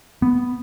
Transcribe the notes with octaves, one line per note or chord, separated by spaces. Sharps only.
B3